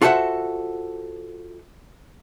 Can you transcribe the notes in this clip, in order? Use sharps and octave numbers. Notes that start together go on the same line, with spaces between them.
F4 F#4 A4 C5 E5 F#5